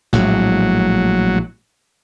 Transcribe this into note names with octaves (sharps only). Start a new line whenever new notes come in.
A#1 A2 F#3 G#3